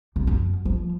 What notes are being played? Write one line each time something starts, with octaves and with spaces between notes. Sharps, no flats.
C2
F#2
F3